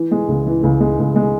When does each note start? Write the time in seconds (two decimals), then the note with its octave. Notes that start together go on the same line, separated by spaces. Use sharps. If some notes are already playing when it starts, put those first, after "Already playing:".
Already playing: E3
0.11 G#3
0.28 C#2
0.46 E3
0.63 C#2
0.80 G#3
0.99 C#2
1.16 G#3